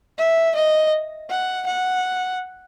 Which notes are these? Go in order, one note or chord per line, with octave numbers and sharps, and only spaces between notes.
E5
D#5
F#5
F#5